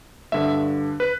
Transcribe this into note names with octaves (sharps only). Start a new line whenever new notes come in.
G2 D3 E5
B4